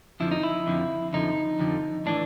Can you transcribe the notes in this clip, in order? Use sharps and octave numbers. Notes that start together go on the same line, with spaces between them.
F2 D3 F3 E4
D#4
E4
F2 D3 F3
F2 D3 F3 D#4
F2 D3 F3
A2 E3 D4